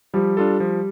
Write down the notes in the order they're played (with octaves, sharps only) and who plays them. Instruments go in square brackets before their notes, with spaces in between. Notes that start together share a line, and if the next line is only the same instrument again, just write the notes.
[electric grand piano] F3 [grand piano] G3
[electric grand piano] D4 F4 A4
F3